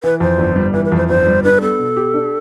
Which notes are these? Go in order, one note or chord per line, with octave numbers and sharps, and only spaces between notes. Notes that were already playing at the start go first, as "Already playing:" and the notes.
E3 B4
F2 C5
G1
G3
E3 B4
B4
F2
C5
G1 C5
G3
D4 B4
B3 A4
B2
G4
D4